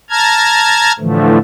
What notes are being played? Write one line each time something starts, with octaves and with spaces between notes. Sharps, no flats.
A5 A#5 F6 G#6
A2 D3 E3 F3 A3